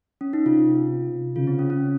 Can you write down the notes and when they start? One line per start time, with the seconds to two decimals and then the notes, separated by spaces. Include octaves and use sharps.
0.21 C#4
0.33 D#4
0.45 C3 F4
1.36 C#3 F4
1.47 C4
1.59 C#4
1.70 C#4